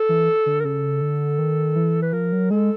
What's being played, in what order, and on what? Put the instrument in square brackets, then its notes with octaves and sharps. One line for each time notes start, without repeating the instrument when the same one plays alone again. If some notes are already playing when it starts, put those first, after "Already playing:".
Already playing: [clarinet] A4
[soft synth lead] E3
D3
[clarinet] A#4
[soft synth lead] C#3 [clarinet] A4
[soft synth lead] D3
D#3
E3
[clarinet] B4
[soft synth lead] F3 [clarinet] A#4
[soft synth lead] F#3
[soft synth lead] G#3 [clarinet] A4